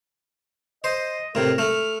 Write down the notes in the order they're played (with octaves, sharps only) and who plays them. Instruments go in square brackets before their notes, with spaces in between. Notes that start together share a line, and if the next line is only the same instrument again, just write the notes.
[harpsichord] C5 [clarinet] D#5
[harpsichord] A2 C3 [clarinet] A#4
[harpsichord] A3 [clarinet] F6